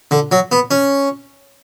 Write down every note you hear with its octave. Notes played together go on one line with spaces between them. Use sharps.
D3
F#3
B3
C#4